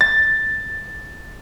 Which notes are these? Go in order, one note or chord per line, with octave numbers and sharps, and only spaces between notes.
A6